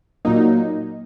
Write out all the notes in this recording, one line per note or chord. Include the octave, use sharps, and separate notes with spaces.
A#2 F#3 A#3 D#4